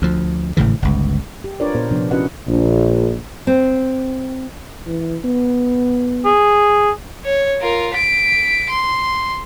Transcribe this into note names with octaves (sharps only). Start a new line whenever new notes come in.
D2 F3
G#1 A2 C#3 E3
G1 C#2
G4
D4 F4 A#4 B4 C#5 D5
A#2 B3 A#4 C5
C3 F3 B3 D4
C#4 E4 F#4 B4 D#5 F#5
A#1
C4
E3
B3
G#4
C#5
F4 A#4
B6 D7
C6